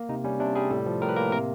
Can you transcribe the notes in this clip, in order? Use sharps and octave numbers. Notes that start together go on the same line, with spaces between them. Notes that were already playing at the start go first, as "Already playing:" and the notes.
Already playing: A#3
C3 D#4
G3 C#4
C3 D4
G3 G#4
A2 A4
F3
A2 A#4
B4
A#3 A#4
C3 A#4